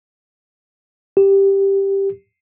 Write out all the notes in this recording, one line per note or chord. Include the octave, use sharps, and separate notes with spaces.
G4